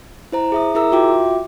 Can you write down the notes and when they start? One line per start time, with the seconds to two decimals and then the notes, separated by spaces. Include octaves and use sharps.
0.32 E4 C5 A#5
0.52 G#4 E5 D#6
0.75 E4 G#4 A#4 E5 A#5 E6
0.92 F4 F#4 E5 G5 D6